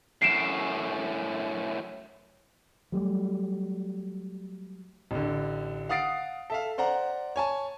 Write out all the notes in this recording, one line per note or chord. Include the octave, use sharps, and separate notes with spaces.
F#2 A2 C7 D7 E7
F#3 G3 A3
A1 D3
F5 F#5 D#6 A6 C7 D7
A4 E5 F5
C5 D5 F#5 A#5
C#5 G#5 A5